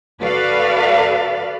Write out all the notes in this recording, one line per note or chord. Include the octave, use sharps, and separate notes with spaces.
F#4 A4 B4 D5 F5